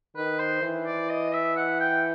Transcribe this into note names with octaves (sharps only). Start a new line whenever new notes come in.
D#3 B4
C5
E3
D5
D#5
E5
F#5
G5